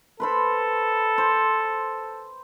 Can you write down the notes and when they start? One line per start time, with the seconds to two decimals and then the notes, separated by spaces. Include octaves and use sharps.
0.20 A4 B4 C5 B5
1.18 C5